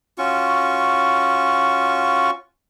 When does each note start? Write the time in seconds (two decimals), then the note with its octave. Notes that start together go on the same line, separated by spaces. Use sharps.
0.18 C#4 F4 F#4 C#6